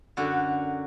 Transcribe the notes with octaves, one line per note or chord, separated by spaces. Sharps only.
F#2 D3 F#3 F#4